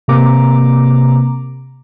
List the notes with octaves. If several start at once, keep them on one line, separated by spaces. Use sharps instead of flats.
C3 A#3 A#5 D6